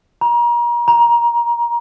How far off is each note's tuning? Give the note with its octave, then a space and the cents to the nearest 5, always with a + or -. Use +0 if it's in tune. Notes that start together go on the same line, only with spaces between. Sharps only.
A#5 +35
A#5 +20